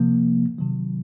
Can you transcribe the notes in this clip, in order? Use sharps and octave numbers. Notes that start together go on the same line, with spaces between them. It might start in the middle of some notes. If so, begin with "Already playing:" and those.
Already playing: C3 F3 A#3
C3 D#3 F#3